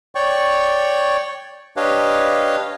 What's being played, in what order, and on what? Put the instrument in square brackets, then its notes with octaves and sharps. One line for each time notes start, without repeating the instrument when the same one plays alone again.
[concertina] C#5 D5 G5 C#6
D4 G4 B4 C#5 D#5 F5